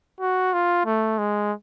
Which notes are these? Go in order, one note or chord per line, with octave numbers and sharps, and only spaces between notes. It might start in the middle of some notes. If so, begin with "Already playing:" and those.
F#4
F4
A3
G#3